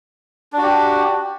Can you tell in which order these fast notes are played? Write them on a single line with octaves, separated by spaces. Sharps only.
D4 F#4 G4